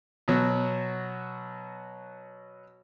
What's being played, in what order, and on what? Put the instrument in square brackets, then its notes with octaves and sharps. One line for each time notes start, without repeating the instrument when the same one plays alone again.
[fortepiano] B2 F#3